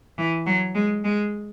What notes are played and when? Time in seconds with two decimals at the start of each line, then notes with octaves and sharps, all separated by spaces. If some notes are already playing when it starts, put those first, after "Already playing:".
0.18 E3
0.46 F#3
0.75 G#3
1.04 G#3